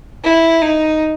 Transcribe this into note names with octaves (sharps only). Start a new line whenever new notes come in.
E4
D#4